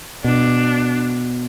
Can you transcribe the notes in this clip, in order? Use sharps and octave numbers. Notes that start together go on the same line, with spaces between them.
B2 D4